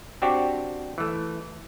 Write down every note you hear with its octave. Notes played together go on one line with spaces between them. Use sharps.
C4 D4 F#4 G4
E3 A3